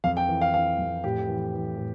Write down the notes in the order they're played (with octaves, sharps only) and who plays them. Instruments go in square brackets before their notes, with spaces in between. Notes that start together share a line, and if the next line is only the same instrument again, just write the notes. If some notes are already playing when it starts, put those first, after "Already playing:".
[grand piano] F2 F5
G5
E3
F5
E3 F5
F2
A2 G4
E3
E3
A2